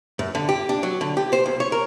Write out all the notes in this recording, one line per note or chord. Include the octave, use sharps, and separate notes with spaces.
F#2
D3
G4
D4
F#3
D3
G4
C5
B1
C#5
A#4